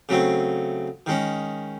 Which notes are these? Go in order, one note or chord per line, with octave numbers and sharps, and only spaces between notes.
C#3 F#3 A3 C4
D#3 G#3 C#4